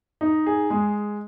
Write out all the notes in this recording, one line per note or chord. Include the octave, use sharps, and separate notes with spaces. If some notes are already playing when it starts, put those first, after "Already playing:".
D#4
G#4
G#3